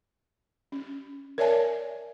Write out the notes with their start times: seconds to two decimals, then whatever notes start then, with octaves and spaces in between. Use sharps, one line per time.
0.72 C#4
1.38 A#4 C#5 D5 E5 G#5 A5